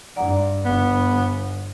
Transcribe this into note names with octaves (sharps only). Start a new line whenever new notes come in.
G2 D5 F#5 A#5
G1 B3